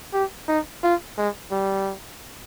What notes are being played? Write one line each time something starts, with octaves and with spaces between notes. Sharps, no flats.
G4
D#4
F4
G#3
G3